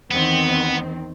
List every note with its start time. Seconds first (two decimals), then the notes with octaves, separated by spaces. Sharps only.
0.11 E2 D#3 B3 C4